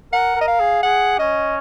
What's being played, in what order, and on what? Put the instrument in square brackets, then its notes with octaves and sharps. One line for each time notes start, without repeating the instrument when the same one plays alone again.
[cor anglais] A#4 [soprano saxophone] F#5
[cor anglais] A#4
[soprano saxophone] D#5
F5
[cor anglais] G#4
[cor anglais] G#4 [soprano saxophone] F#5
[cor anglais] C#4 [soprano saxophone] D#5